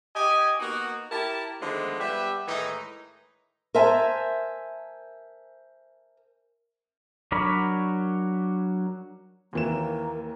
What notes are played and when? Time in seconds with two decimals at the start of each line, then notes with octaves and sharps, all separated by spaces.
0.15 G4 D#5 G#5
0.59 A#3 B3 D#4 F#4
1.11 E4 G4 A#4 A5
1.61 D3 D#3 F3 G#3 A3 B3
1.99 G3 B3 G4 B4 E5
2.48 A2 D#3 E3 G#3 D#4
3.75 A#4 C5 E5 G#5 A5
7.32 F#3 D4 A#4 C#5 B5
9.53 D#2 E3 A#3 E7